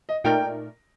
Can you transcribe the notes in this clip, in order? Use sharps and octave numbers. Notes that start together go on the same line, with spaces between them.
D#5
A#2 A3 D#4 A#4 D5 G5